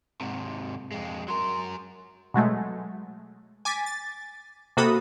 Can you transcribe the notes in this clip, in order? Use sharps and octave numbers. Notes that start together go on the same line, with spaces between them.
G#2 C3
F2 G#3
F#3 A#4 C6
B2 F#3 G#3 A3
G#5 D6 A6 B6
A6
C3 A#3 F#4 A4 B5 D#6